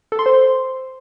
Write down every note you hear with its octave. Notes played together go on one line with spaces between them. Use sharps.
A4
C6
C5